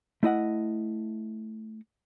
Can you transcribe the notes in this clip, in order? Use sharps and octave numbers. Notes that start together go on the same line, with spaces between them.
A3 E4 D#5 F#5